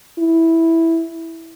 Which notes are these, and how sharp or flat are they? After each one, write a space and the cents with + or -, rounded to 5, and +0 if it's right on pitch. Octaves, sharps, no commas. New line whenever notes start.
E4 -5